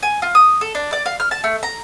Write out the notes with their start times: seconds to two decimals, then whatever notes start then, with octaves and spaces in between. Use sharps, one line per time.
0.03 G#5
0.22 F4
0.35 D#6
0.61 A4
0.75 D4
0.93 D5
1.06 F5
1.20 F6
1.31 A5
1.44 A3
1.63 A#5